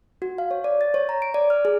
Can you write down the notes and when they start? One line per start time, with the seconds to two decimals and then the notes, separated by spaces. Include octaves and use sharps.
0.22 F#4
0.38 F5
0.51 C#5
0.64 D5
0.81 A6
0.94 C#5
1.09 A#5
1.22 D7
1.34 D5
1.50 F6
1.65 G#4